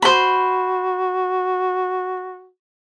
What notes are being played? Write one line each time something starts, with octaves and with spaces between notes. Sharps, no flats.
F#4 C5 B5